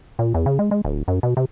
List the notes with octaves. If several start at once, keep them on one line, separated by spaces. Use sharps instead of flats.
A#2
E2
C#3
G#3
G#3
D1
F#2
B2
C3